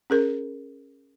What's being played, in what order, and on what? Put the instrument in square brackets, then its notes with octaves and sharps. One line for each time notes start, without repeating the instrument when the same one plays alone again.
[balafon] C#4 G#4 A#4